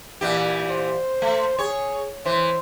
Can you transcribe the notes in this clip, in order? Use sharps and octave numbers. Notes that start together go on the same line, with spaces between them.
A#2 E3 G4
C5
A3
G#4 C#5
E3 C5